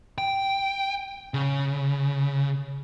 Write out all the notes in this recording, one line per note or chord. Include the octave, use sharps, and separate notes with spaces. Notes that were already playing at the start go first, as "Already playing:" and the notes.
G5
C#3